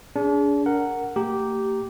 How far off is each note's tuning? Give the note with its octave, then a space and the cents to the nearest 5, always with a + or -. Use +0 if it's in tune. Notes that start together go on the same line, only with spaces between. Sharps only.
D4 -40 G#4 +0
A#4 -10 F#5 +0
A3 +45 G4 -10 A#5 +0